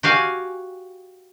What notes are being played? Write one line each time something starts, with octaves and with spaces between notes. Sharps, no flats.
F#4 G4 F5 G#5